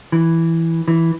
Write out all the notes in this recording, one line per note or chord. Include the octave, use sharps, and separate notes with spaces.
E3
E3